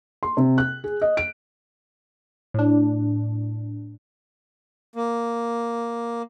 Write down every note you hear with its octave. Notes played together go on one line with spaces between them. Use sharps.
C6
C3
F#6
G#4
D#5
D7
A2 D4
A#3